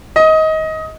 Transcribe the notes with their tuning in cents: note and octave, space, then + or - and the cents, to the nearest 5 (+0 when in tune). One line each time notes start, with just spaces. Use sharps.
D#5 +20